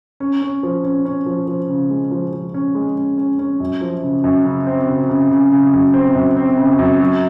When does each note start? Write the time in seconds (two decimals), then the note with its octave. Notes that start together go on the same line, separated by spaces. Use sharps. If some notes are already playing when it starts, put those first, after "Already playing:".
0.20 C#4
0.42 C#4
0.63 F3
0.84 C#4
1.05 C#4
1.26 F3
1.47 F3
1.69 C#3
1.90 G#3
2.11 F3
2.33 F3
2.54 C#4
2.75 G#3
2.97 C#4
3.17 C#4
3.39 C#4
3.60 F#2
3.81 F3
4.03 C#3
4.24 F#2
4.45 C#3
4.67 C4
4.88 C#3
5.09 C#3
5.31 C#3
5.52 C#3
5.73 F#2
5.94 C4
6.15 F#2
6.37 C4
6.57 C#3
6.79 F#2
7.00 F#3